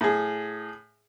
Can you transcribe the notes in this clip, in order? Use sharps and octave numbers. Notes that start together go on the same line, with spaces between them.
A2 G#4